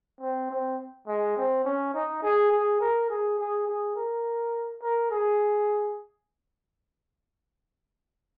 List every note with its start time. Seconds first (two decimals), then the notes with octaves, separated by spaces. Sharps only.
0.21 C4
0.51 C4
1.07 G#3
1.37 C4
1.65 C#4
1.94 D#4
2.22 G#4
2.52 G#4
2.80 A#4
3.10 G#4
3.39 G#4
3.67 G#4
3.96 A#4
4.82 A#4
5.11 G#4